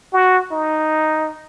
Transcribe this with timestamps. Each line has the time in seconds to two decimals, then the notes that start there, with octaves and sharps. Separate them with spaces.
0.13 F#4
0.52 D#4